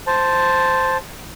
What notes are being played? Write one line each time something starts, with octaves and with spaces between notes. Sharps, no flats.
C5 A5